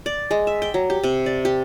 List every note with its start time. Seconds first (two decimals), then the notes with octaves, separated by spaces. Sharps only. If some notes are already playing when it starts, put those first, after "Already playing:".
0.06 D5
0.31 G#3
0.47 E5
0.62 G5
0.74 F#3
0.90 G4
1.04 C3
1.26 D5
1.45 G4